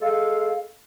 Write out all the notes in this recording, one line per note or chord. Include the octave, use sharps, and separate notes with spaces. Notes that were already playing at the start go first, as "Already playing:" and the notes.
G#3 A4 F5